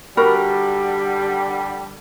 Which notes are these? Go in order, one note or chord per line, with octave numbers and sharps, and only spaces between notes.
D3 G3 F#4 A#4 B5